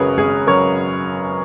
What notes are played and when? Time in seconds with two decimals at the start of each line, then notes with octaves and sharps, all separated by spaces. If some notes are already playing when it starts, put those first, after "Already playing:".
Already playing: G#1 F#2 C#3 F#3 G#4 A#4 B4 C#5
0.18 G#1 G#4
0.47 F#2 C#3 F#3 A#4 C#5